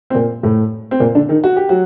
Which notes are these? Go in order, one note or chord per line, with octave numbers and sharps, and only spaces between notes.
C4
A#2 A#3
A2 A3
C4
A#2 A#3
D3 D4
D#3 D#4
F#4
G4
F#3 F#4